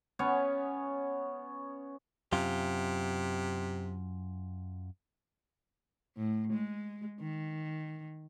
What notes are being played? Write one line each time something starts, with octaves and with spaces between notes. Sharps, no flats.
B3 C#4 C#5
F#2 C3 F4
A2
G#3
D#3